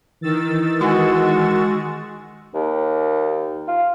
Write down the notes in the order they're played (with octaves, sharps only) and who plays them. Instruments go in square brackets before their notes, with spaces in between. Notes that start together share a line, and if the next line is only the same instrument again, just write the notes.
[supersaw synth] D#3 E6 A6 [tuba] E3
[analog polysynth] G#3 [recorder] F#4
[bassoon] D#2
F4